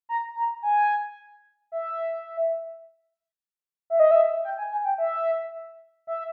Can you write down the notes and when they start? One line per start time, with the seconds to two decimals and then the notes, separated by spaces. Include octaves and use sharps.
0.09 A#5
0.36 A#5
0.63 G#5
1.72 E5
3.90 E5
4.00 D#5
4.11 E5
4.44 G5
4.58 G#5
4.71 G#5
4.85 G5
4.98 E5
6.07 E5